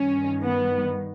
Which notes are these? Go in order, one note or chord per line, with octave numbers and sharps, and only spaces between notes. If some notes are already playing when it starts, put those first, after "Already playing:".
Already playing: G2 D#3 C#4
B3